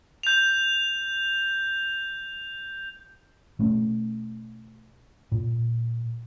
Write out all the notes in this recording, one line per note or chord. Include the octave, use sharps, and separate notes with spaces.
G6 F7
B2 A3 C#4
A#2